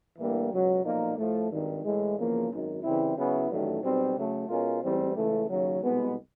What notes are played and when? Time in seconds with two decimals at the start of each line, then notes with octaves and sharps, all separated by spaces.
0.17 A2 E3 G3 A#3 D4
0.50 C#2 B2 F#3
0.83 B1 A#2 F3 A#3 D#4
1.17 A2 F3 A3
1.49 G#1 G2 D#3
1.84 A2 E3 G#3
2.16 E2 C#3 F3 A#3
2.49 G#1 F#2 D#3
2.82 C#3 E3 G3 C4 E4
3.16 C#3 F#3 B3 E4
3.48 A1 G2 D#3 F#3 A3
3.82 B1 B2 G3 C4
4.15 C#3 F#3 A3
4.48 B2 G#3 C#4 F4 A#4
4.82 A1 G#2 E3 G3 C4
5.15 C#2 C#3 E3 A3
5.48 D#2 C#3 F#3
5.81 C2 B2 G#3 B3